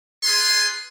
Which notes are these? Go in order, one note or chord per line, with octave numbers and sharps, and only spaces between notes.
F4 G#4 B4 G#5 C6